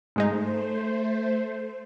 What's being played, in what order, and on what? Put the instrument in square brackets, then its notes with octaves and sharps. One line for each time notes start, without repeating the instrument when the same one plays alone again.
[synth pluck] G#2 G#3 D#4 [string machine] A3 C5